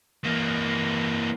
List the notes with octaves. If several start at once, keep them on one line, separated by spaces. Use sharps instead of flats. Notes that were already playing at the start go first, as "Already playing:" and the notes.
E3 A#3